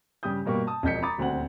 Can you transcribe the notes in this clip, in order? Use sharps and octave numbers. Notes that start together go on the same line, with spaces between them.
G2 C#3 G4 D#6 G6
G2 B2 A#3 G4 C#6
A5 D#6
E1 F2 D#5 G6 B6 C#7
A#5 B5 D6 D#6 A6
D#1 D2 C4 F#4 F#5 F#7